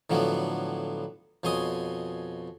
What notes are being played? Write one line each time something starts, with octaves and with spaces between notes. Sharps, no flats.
A2 D3 F3 F#3 B3
F2 B2 C#5 G#5 C6 D#6